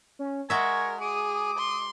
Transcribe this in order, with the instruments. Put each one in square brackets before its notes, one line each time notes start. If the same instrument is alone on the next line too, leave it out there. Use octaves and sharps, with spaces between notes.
[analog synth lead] C#4
[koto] G#3 F#4 E5 [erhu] A#4 [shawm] G#5 [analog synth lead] C#6
[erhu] G#4 [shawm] D6 [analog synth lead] D#6
[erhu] C6